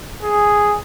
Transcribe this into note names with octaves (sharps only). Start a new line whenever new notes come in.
G#4